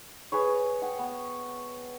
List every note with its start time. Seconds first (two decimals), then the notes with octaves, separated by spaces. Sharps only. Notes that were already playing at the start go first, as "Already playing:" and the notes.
0.32 G#4 B4 C#5
0.82 F#5 G5
0.99 B3